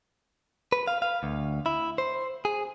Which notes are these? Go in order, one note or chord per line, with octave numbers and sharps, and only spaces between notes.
B4
F5
F5
D2
E4
C5
G#4